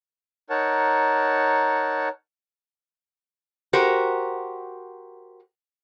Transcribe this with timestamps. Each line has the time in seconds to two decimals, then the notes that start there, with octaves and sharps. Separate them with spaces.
0.50 D#4 A#4 C#5 F#5 A5
3.73 F#4 G4 A#4 C5